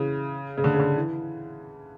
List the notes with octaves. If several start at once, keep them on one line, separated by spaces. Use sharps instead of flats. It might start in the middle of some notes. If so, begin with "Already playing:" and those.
Already playing: C#3 E3
C#3
D3
C#3
D3
E3